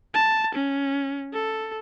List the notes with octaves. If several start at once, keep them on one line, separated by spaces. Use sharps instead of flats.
A5
C#4
A4